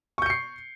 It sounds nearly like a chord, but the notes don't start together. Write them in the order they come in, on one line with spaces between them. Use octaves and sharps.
C#6 G6 C#7 C7